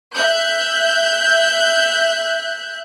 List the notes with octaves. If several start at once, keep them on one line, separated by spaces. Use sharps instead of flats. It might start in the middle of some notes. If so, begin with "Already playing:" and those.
E5 F#6 G6